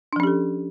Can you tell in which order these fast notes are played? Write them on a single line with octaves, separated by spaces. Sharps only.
D4 F3 C#4 G4 A4